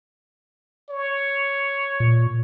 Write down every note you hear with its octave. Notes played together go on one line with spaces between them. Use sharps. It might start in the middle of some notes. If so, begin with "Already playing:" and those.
C#5
A#2